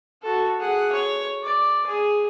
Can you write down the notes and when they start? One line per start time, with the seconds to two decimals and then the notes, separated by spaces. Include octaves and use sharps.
0.22 F#4 A4
0.60 G#4 F#5
0.92 C#5
1.43 D5
1.86 G#4